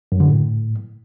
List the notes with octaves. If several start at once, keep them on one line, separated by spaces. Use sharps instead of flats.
F#2
D3
A2